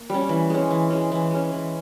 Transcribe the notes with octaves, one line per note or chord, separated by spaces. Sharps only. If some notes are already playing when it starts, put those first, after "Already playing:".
Already playing: A#3
G3 C#4
E3
G#3 C#4
E3
G#3 C#4
E3
G#3 C#4
E3